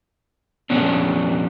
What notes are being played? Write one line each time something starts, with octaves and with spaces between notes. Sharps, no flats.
F2 A#2 B3 C#4 D4